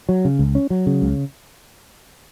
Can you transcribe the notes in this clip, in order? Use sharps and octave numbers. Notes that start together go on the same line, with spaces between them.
F#3
C#3
C#2
C#4
F#3
C#3
C#2